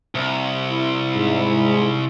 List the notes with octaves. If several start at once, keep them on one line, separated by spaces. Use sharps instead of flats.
C2
E4
G#2